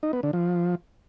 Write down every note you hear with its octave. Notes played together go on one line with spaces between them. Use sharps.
D#4
B3
D3
F3